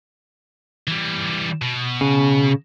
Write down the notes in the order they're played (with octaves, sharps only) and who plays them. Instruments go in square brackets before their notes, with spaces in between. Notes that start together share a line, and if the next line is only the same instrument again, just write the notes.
[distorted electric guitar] E3 G3
B2
[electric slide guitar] C#3